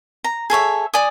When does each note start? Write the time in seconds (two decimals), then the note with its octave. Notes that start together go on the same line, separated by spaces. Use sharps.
0.24 A#5
0.50 G#4 A4 C#5 E5
0.94 D5 G#5 D#6